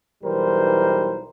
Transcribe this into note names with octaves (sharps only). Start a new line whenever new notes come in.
B1 E3 G3 A#4 C5